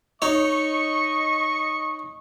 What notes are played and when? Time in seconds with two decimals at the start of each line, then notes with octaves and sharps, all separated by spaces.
0.22 D#4 C#5 D#5 C#6